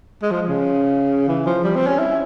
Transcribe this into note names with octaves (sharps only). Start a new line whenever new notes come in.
G#3
F3
C#3
E3
F3
G3
C4
C#4
E4